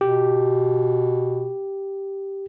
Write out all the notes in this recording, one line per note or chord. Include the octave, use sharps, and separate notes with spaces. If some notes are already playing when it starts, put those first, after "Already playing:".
B2 G4